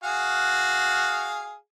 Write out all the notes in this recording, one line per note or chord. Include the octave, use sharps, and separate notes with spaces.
F#4 G#4 F5